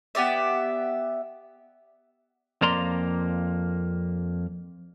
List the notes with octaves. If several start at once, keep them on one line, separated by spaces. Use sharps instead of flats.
B3 G4 D5 E5
F2 A#3 D5 A#5 C6